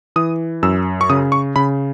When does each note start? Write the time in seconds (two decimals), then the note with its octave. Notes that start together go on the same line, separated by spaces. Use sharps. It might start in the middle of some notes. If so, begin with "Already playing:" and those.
0.16 E3 D#6
0.63 F#2 E6
1.01 C#6
1.10 C#3 D#6
1.32 C#6
1.56 C#3 B5